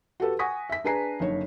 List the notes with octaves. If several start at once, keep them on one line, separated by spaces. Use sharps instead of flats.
F#4 G4 A4 B4
F#5 G#5 C#6 D#6 A#6 B6
E5 B6
D4 G#4 B4 G#5 A#5 C7
F#1 D3 D#4 C#5